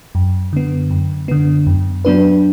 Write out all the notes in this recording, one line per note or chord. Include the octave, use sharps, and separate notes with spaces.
F#2
D3 B3
F#2
D3 B3
F#2
F#3 B3 D4 B4